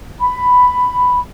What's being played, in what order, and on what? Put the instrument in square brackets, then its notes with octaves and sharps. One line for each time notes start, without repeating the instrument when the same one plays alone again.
[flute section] B5